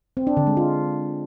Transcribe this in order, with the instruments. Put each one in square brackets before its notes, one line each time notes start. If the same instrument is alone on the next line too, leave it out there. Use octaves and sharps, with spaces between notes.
[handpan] C4
D4
D3
G#3
F4